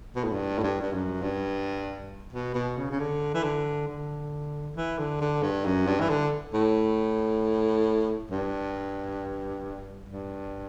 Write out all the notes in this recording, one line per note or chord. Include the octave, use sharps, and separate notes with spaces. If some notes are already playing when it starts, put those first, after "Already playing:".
B2
A2
G2
A2
G2
G2
F#2
G2
B2
B2
C#3
C#3
D3
E3
D3
D3
E3
D3
D3
G2
F#2
G2
E3
D3
A2
G2
G2